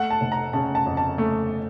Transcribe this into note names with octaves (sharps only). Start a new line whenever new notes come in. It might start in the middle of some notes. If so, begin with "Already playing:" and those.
Already playing: A3 F#5
A5
F1
A#5
C#3 A5
A5
F2
A5
A3